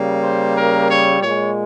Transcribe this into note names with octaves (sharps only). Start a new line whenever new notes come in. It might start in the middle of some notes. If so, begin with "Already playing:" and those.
Already playing: C#3 G3 A#3
C5
A#4
C#5
A#2 G#3 C#5